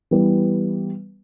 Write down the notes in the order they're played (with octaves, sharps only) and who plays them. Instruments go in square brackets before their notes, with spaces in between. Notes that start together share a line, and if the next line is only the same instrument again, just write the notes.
[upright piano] E3 G3 B3